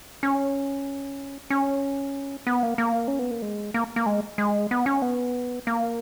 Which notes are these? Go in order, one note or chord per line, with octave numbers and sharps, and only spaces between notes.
C#4
C#4
B3
A#3
A#3
C#4
B3
A#3
G#3
A#3
A#3
G#3
G#3
B3
C#4
B3
A#3